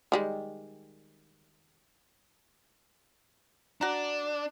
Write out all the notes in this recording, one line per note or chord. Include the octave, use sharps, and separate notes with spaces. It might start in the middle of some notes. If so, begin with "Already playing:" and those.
D#3 G3 G#3
D4 F#4 A#5